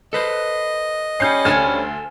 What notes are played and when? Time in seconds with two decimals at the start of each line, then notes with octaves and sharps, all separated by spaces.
0.13 A4 B4 C5 D#5
1.20 G3 C#4 G6 C7
1.45 D2 A4 C5 G#5 F6 G#6